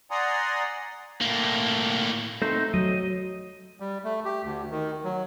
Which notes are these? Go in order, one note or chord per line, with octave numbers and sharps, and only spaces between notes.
D5 F#5 G#5 A#5 C6 D#6
A2 A#3
A3 C4 D#4 C5
F#3 D#5
G3
A3
G4
D2
D#3
F#3